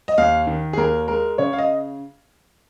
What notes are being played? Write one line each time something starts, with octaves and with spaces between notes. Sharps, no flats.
D#5
D#2 F5
D#3
G#4
D#2 A#4
G#3 A#4
C#3 C#5
F5
D#5